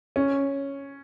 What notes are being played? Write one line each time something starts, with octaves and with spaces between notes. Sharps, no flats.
C#4